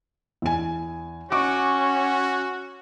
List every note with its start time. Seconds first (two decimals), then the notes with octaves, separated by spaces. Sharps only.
0.42 E2 G#5
1.32 C#4 F#4 C#6 D6